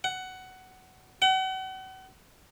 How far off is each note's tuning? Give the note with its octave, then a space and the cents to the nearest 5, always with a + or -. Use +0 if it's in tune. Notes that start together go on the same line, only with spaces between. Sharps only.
F#5 +15
F#5 +40